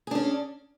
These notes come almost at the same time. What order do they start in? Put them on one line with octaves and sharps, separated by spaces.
G#4 D4 C#4